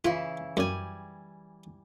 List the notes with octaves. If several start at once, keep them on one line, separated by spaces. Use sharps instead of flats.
C#3 E3 E4 F4
F#2 G3 G#5